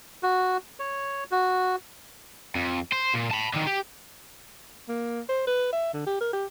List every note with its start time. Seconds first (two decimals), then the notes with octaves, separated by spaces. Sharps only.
0.23 F#4
0.79 C#5
1.31 F#4
2.56 F2
2.92 C5
3.14 A#2
3.31 A5 B5
3.54 D3 D#3
3.67 G4
4.89 A#3
5.29 C5
5.47 B4
5.73 E5
5.94 D3
6.07 G4
6.21 A#4
6.33 G4